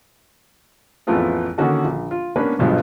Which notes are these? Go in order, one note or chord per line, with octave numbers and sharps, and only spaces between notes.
A1 F2 A3 B3 F4 G#4
D3 D#3 A#3 C#4 F#4 A4
A#1
F4
A#3 B3 C#4 D4 B4
B1 G2 B2 F3 F#3 G#3